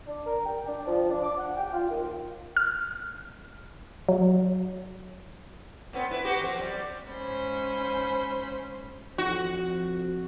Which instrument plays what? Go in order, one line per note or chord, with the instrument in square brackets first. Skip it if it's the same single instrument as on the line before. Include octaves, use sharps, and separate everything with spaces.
[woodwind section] D4
A#4
G5
D4
F3
D4
D6
F#5
G5
F4
D#2
[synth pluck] F6
F#3
[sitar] A2 B3 C4
E4 B4
F#4 G4
F2 C4
G3
[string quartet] G#2 C#4 C5 B5
[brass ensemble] F2 [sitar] F#4